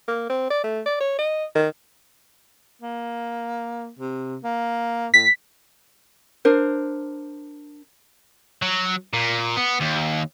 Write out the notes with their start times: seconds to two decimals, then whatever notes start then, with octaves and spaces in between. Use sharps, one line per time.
0.08 A#3
0.30 C4
0.50 D5
0.64 A3
0.86 D5
1.01 C#5
1.19 D#5
1.55 D#3
2.82 A#3
3.99 C3
4.44 A#3
5.14 A2 B6
6.45 D4 A#4 C5
8.62 F#3
9.13 A#2
9.56 B3
9.80 D#2